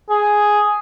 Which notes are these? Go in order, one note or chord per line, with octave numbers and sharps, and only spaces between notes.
G#4